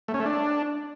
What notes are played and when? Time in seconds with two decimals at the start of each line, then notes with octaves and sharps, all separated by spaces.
0.08 A3
0.14 C#4
0.20 A3
0.26 D4